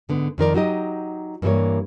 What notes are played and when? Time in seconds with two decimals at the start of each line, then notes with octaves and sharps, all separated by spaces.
0.09 G#2 D3 B3
0.38 F2 D#3 A#4 D5
0.54 F#3 D#4 G4 D#5
1.42 G2 E3 F#3 G3 A#3 C#5